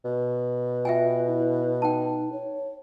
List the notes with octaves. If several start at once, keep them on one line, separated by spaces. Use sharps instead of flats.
B2
F4 E5 G5 G#5
E4
D#4 G5 A5
C#5